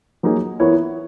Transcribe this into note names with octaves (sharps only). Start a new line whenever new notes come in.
F#3 A#3 D#4 G#4
E3 B3 E4 A#4 C#5